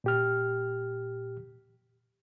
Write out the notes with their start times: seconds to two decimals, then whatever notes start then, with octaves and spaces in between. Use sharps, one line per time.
0.04 A#2 G4 F6